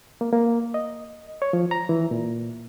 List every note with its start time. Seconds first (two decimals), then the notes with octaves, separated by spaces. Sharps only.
0.21 A#3
0.33 A#3
0.74 D#5
1.42 C#5
1.53 F3
1.71 A#5
1.89 E3
2.11 A#2